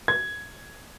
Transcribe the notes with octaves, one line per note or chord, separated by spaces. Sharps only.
G#6